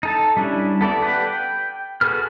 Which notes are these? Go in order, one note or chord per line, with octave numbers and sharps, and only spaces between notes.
D#4 A4 A5
G3 C#4 D4 E4
B3 A4 D5 E5
G4 A4 B4 D5 F#5
G5
F#4 G#4 A4 B4 F6